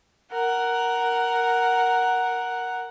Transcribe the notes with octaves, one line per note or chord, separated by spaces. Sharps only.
A#4 F#5